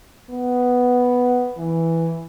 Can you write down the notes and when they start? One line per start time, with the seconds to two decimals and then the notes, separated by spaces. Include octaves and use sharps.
0.30 B3
1.58 E3